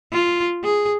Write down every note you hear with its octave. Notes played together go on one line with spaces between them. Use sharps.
F4
G#4